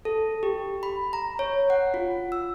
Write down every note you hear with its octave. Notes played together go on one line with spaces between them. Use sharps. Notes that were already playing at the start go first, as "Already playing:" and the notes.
A4
G4
B5
A#5
C#5
F#5
F4
E6